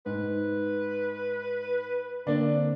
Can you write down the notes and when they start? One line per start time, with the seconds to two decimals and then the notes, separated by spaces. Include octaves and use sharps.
0.06 G#2 B4
2.27 D3 A#3 C4 D4